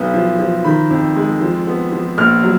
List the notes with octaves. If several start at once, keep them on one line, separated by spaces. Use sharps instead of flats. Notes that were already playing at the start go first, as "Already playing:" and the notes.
Already playing: B1 B3
F3
F3
D#3 B5
F2
G#3
F3
B3
F3
A#1 F6
F#3